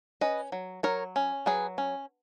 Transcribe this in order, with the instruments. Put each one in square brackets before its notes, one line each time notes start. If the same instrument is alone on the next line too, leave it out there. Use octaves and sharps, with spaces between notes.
[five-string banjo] C#4 B4 D#5
F#3
F#3 A#4 C#5
C#4
F#3 G#4 B4
C#4